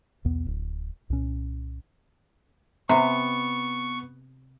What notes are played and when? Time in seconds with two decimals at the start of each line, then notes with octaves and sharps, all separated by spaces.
0.25 B1 E2 B3
0.47 D1
1.10 C2 A#2 C#4
2.89 C3 B3 C#6